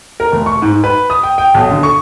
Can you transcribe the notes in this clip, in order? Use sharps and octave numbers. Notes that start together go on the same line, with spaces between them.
A#4
F1
C#6
G#2
B4
D#6
G5
G5
B1
D3
C#6